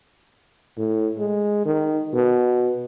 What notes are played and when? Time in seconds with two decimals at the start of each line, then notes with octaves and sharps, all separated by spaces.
0.77 A2
1.18 G#3
1.65 D#3
2.14 B2